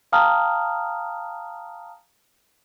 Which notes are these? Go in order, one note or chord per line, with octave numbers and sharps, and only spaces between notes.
F5 G5 A5 A#5 D#6 F6